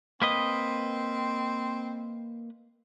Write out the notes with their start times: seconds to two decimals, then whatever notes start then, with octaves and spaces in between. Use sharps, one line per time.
0.22 A#3 C4 B4 D#5